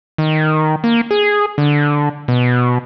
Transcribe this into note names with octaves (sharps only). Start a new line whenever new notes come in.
D#3
A#3
G#4
D3
B2